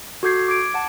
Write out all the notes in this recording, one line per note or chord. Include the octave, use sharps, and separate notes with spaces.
F#4 A4 D6 G6 G#6 C7
D6 G#6 D7
F#5 A5